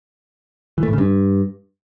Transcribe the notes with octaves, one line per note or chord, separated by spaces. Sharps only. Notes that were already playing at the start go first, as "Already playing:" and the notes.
E3
A3
A2
C#3
G2